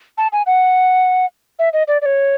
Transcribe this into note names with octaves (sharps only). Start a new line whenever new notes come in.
A5
G#5
F#5
E5
D#5
D5
D5
C#5